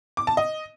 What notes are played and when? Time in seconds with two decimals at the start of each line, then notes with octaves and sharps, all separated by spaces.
0.17 D6
0.27 A5
0.37 D#5